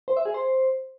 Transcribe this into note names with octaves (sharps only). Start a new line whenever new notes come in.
C5
E5
G#4
C5